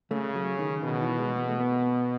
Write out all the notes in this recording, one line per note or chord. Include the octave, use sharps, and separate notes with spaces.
C#3 A3
F#3
D#3
B2 D#3
E3
G#3
B3
A3
B3